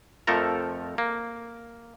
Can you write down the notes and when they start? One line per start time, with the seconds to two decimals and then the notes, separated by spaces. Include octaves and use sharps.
0.27 F2 F3 A3 A4 A#4 A#5
0.98 A#3